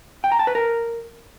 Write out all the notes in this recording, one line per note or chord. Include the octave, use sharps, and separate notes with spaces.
G5
A#5
A5
B4
A#4